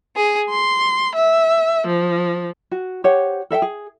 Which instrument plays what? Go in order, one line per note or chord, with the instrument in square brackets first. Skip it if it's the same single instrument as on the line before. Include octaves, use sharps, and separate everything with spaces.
[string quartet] G#4
C6
E5
F3
[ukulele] F#4
G4 C5 C#5 F#5
A4 E5 F5 G5
G#4